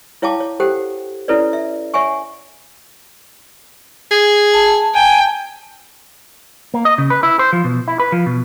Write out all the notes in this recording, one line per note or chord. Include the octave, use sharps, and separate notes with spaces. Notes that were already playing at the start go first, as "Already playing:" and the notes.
E4 C#5 F5 G5 A5 D6
C#5
G4 A4 C5 F#5 G5
C#4 E4 A4 B4 C#5 D5
E5
C#5 E5 F#5 G#5 C#6
G#4
A5
G5 G#5
A#3
D#5
C#3
B4
E4
C5
F3
B2
E4
B4
F3
B2